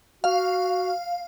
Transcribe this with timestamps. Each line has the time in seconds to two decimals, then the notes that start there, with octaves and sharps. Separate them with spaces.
0.24 F#4 F5